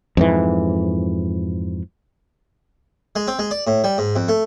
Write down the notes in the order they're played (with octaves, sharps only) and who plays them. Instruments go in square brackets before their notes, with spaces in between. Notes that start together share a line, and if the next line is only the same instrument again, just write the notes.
[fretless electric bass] F2 G#2 E3
[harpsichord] G#3
C4
G#3
D5
A2
G3
G#2
F2
A3